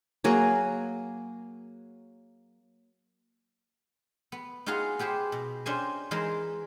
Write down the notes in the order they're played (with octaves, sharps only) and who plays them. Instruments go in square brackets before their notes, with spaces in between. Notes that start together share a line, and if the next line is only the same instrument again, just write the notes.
[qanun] F#3 A#3 G#4
[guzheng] B3
D#4 F4 F#4 G#4 F5 F#5
B3 G4 G#4 C5
B2
C#4 D4 G4 C5 D#5 G#5
E3 G#3 D#4 G#4 A#4 C5